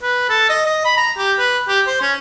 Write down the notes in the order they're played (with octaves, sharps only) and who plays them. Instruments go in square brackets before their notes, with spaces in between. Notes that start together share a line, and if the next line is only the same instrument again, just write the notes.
[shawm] B4
A4
D#5
D#5
B5
A#5
G4
B4
G4
C5
C#4